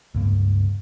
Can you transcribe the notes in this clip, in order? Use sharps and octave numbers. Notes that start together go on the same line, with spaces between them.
C#2 G2 A#3